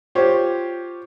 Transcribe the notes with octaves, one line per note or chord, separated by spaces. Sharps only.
F4 G4 C5 C#5